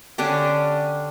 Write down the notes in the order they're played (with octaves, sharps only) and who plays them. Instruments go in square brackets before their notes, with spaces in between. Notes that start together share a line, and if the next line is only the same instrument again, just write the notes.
[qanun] D3 C#4 D4 G4